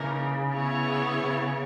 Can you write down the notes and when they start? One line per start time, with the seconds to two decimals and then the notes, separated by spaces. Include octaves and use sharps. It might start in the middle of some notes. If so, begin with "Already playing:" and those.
Already playing: C#3 E3 A#3 D#4 A#4
0.54 B3 E4 G#4 C#5
1.23 C#3